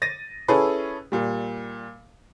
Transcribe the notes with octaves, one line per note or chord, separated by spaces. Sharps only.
A6 A#6 D#7
C#4 E4 G#4 A4 B4
A#2 G3